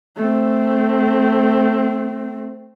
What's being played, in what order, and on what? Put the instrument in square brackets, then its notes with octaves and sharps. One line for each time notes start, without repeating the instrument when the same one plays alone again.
[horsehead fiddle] A3 C4